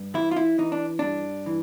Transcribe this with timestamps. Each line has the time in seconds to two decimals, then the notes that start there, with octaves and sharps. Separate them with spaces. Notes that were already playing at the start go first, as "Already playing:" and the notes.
Already playing: G2
0.14 E3 E4
0.31 F4
0.36 E4
0.58 E3 D#4
0.72 D4
0.99 G2 D4
1.46 E3